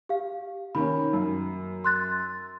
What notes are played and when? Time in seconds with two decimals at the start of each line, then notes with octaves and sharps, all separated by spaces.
0.09 G4 F5
0.75 D#3 A#3 C#4 B5
1.13 F#2
1.84 C6 F#6 A6